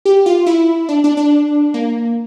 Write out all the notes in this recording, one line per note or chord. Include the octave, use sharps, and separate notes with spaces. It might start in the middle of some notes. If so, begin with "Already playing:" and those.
G4
F4
E4
D4
D4
D4
A#3